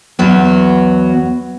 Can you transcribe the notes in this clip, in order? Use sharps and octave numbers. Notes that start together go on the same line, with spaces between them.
E2 F#3 B3